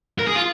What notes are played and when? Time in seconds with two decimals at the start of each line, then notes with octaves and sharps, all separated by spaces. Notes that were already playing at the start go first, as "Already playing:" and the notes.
0.19 A#4
0.27 G#4
0.35 F4